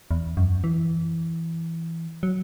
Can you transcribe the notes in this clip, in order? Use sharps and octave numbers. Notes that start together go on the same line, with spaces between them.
E2
F#2
E3
F#3